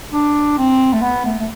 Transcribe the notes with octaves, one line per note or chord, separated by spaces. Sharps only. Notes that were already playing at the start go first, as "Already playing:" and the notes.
D4
C4
A3
B3
A3
A3